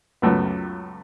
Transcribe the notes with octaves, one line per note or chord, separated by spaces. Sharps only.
C#2 F#2 A3 B3